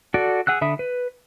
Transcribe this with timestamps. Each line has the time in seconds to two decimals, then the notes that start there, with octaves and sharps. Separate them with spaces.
0.14 F#4 A4 D5
0.47 G#4 F#5 E6 F#6
0.61 D3 E5 B5 D#6
0.79 B4